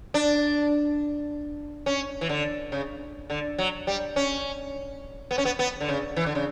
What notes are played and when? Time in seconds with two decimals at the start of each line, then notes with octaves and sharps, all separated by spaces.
0.14 D4
1.86 C#4
2.21 E3
2.29 D3
2.72 C#3
3.30 D3
3.58 F#3
3.87 G3
4.16 C#4
5.31 B3
5.38 C#4
5.45 B3
5.59 B3
5.81 D3
5.88 C#3
6.16 E3
6.26 D3
6.35 C#3